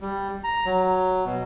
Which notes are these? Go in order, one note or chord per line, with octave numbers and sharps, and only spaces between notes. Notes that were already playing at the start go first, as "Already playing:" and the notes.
G3
A#5
F#3
B2